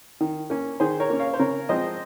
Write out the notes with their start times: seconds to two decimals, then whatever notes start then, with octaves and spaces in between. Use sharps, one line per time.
0.21 D#3
0.50 A#3 C#4
0.80 D#3 G#4 C5
1.00 A#4 C#5
1.10 A#3 C#4
1.20 C#5 F5
1.33 C5
1.39 C#3 A#4 C#5
1.69 F3 G#3 C4 C5 D#5